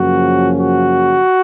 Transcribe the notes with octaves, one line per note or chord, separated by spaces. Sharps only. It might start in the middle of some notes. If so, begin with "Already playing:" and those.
Already playing: F#2 C#3 F3 A#3 C#4 F#4
F#4